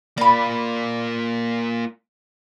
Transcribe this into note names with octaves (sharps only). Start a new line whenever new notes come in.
A#3 F4 D5 B5